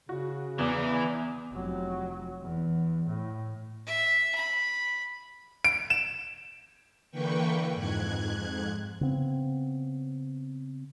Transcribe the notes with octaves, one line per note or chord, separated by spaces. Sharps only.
C#3 F#4
E2 E3 D5
F1 F#3
E2
A2
E5
B5
D7
E7
D3 E3 A#3 B4 G5 C#6
F2 G#2 F#6 G#6
C#3 B3 C4